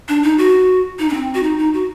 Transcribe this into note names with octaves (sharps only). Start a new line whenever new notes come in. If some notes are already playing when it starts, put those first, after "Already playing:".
D4
D#4
F#4
D#4
D4
C4
F#4
D#4
D#4
F#4